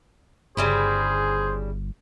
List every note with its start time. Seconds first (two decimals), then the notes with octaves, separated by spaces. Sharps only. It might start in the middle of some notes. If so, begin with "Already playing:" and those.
0.57 G1 C#3 G3 E4 G#4 C5